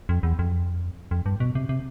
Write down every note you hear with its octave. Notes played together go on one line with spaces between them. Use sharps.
F2
E2
F2
F2
G2
B2
C3
C3